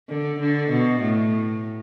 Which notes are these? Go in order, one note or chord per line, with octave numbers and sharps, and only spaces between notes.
D3
D3
B2
A2